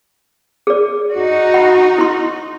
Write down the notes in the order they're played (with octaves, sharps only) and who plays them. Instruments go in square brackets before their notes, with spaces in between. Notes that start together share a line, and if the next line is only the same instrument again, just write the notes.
[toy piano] G#4 D5
[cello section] D#4 F#4
[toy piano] F#5 B5
E4 C6